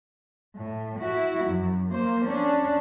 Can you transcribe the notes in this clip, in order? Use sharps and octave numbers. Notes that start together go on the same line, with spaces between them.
A2
E4 F#4
F#2
A#3 C5
C#4 D4